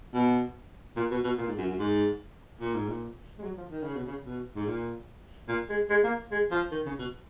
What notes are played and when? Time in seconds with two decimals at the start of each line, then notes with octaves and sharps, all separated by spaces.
0.14 B2
0.96 A#2
1.11 B2
1.24 B2
1.38 A#2
1.48 G#2
1.58 F#2
1.68 F#2
1.79 G#2
2.60 A#2
2.74 G#2
2.88 A#2
3.38 G#3
3.43 F#3
3.57 F3
3.70 D#3
3.83 C#3
3.94 B2
4.06 C#3
4.25 B2
4.56 G#2
4.66 A#2
5.48 A#2
5.70 G#3
5.90 G#3
6.04 A#3
6.31 G#3
6.51 F3
6.71 D#3
6.86 C#3
6.99 B2